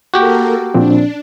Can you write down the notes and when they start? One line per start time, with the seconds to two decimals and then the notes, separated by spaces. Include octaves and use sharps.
0.14 A#3 F#4 G4 A4 A#4
0.74 A#2 F3 C4 D4